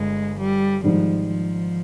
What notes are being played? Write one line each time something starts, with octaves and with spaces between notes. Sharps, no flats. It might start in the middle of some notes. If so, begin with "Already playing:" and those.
Already playing: G1 G#3
G3
G#2 D#3 F3 G3
F3